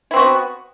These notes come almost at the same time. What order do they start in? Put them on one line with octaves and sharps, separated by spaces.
E4 C4 F#4 B3